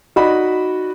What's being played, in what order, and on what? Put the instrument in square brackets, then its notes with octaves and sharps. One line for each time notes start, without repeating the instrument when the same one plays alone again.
[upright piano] D#4 F#4 D5 D#5 F#5 B5